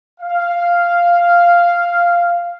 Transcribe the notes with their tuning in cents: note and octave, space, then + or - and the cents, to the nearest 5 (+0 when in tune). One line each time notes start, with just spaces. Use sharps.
F5 -5